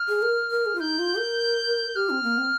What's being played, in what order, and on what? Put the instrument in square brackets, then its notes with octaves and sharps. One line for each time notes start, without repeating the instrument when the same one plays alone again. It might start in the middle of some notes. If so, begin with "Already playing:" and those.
Already playing: [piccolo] F6
[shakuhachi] G#4
A#4
A#4
G#4
F4
[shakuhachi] D#4 [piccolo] G6
[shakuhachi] F4
A#4
[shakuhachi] G4 [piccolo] F6
[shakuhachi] C4
A#3
C4